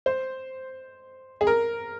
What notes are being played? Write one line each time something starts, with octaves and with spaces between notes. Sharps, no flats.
C5
G#4
A#4